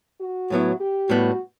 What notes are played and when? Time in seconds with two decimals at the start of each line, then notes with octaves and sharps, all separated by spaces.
0.21 F#4
0.50 A2 F#3 B3 E4
0.80 G4
1.10 A2 G3 B3 F#4